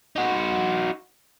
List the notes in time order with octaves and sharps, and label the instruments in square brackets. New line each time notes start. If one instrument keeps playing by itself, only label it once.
[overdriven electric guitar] D#4 F#4